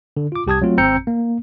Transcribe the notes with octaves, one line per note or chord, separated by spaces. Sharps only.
D3
F4 D6
C2 G4 A5 D#6 G#6
F#3 A3 C4 F4
G#1 C4 A#5 E6 G6 C#7
A#3